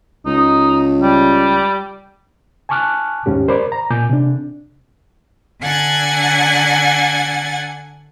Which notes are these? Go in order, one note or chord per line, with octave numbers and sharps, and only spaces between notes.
C#2 D#4
G3
G#5 A5 C#6 D6 F6 F#6
D#2 G#2 C#4 G4
A#4 C5 D5 B5 D6
A#5
A#2 G#5 D6 G6
C3 D4
D3 D4 F#5 G#5 G#6 A6